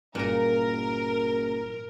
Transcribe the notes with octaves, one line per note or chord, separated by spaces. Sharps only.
F#1 G2 A#2 A#4 A#5